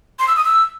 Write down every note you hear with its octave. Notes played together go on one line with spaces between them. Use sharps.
C6
E6
D#6
E6